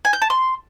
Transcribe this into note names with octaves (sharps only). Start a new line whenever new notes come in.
G#5
G6
A5
C6